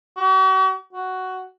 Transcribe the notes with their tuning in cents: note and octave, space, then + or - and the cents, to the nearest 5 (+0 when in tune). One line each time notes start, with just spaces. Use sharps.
F#4 +45
F#4 +10